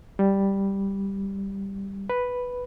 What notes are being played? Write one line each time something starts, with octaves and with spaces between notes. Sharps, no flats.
G3
B4